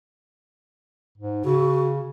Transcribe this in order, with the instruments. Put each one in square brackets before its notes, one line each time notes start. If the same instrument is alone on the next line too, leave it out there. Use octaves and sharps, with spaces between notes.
[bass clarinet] G#2
[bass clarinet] C#3 [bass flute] F#4